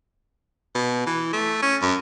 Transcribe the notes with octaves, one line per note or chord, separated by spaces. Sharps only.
B2
E3
A3
C#4
F#2